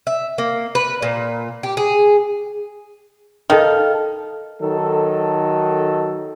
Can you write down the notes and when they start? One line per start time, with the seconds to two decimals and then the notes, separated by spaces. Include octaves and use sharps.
0.07 E5
0.38 A#3
0.75 B4
1.02 A#2
1.63 G4
1.77 G#4
3.50 D#3 A4 F5
4.62 D#3 F#3 A4